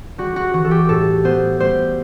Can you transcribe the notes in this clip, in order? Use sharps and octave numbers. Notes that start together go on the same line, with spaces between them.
G3 F#4
F#4
E3 F#4
A4
G4
A2 A4
B3 C5
G3 C5